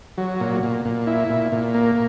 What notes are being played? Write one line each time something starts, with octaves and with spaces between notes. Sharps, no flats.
F#3
A#2
A#2
A#2
E4
A#2
A#2
A#3